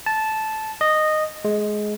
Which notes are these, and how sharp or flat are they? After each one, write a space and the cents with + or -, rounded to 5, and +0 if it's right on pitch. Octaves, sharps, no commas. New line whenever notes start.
A5 -10
D#5 -10
G#3 +15